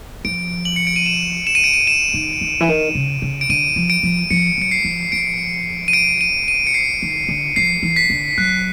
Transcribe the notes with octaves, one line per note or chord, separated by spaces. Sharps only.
F3 D7
F#7
C#7
D7
D#7
E7
E7
D#7
D7
D#7
E7
D#3
D#3
E3
D#3
C#3
C#3
D7
D3 D#7
F3
D7
F3
F3 C#7
F#3 C#7
C7
F3
F3 D7
D#7
D7
D#7
D#7
C#7
C7
D#3
D3
F3 C7
E3
B6
D3
F#3 F#6